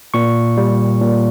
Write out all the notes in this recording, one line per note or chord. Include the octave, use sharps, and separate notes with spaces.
A#2 C#6
G3
A#2